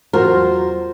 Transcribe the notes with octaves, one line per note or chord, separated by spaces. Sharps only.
E2 F#3 F4 F#4 A#4 C5